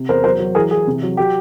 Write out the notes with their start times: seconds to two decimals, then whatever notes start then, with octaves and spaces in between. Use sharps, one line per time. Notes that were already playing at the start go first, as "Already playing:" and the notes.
Already playing: C3
0.09 E2 A#4 C5
0.24 F#3 A#4 C5
0.39 F#3
0.55 E3 G#4 A#4
0.71 E3 G#4
0.87 C3
1.03 F#3
1.17 F#3 G4